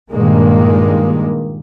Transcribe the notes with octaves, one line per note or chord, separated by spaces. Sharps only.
G2 A#2 D#3 G#3 A#3